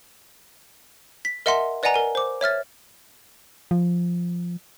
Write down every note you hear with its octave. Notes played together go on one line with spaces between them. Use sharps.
B6
A#4 D#5 E5 F#5 A5 C6
B4 D5 D#5 F#5 G#5 A#5
A#4 G#5
C5 D6
C#5 E5 F6 A6
F3